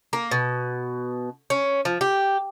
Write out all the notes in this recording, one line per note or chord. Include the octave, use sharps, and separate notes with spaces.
A#3
B2
C#4
F3
G4